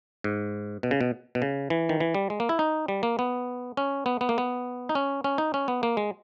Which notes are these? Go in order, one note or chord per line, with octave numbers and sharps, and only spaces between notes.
G#2
B2
C#3
B2
B2
C#3
E3
D#3
E3
G3
G#3
A#3
E4
D#4
G3
A#3
B3
C#4
B3
B3
A#3
B3
D#4
C#4
C#4
D#4
C#4
B3
A#3
G#3